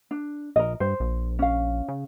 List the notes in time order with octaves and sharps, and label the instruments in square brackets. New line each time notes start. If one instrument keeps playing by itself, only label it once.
[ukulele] D4
[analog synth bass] A#1 [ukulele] A#4 D#5
[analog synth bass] G2 [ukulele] C5
[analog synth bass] A#1
[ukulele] C#4 F5
[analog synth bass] C#3